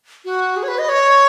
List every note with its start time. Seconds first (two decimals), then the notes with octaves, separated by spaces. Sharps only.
0.25 F#4
0.56 G#4
0.63 C#5
0.68 B4
0.78 D#5
0.89 C#5